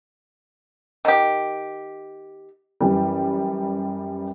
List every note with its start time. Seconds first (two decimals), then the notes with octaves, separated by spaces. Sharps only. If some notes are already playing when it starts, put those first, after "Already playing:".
1.05 D#3 G4
2.81 F#2 E3 G3